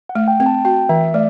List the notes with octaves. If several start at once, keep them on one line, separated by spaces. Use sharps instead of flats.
F#5
A3
G5
C4
A5
F#4 G5
E3 E5
A3 D5